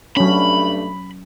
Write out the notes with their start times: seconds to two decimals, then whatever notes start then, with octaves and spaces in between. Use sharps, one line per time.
0.17 G2 F#3 A3 C#4 D4 B5